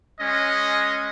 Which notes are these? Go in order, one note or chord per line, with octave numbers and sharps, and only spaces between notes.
G#3 C#4 D#5